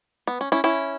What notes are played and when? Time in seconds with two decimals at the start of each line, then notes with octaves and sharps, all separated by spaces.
0.27 B3
0.41 C#4
0.52 C#4 E4
0.64 C#4 E4